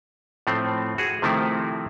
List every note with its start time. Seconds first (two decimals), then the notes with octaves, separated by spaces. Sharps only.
0.47 A2 F3 A3 C4
0.98 F#4 G#4
1.22 C3 D#3 F3 A3 C4 E4